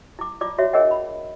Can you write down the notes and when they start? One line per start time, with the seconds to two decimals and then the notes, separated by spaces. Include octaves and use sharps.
0.19 E4 D6
0.41 E4 F4 D5 D6
0.58 F#4 C#5 E5
0.73 D4 G#4 A#4 C#5 D#5 F#5
0.91 B5